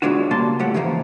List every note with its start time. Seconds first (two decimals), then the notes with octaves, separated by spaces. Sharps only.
0.02 B2 F#3 G#3 D4 F4 F#4
0.31 C#3 G3 A#3 A5 C6
0.59 C#2 A2 F#3 G4 F#5
0.74 G#2 C#3 E3 F3 A#3